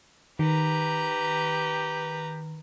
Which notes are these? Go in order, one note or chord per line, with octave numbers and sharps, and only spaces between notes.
D#3 G4 B4 A#5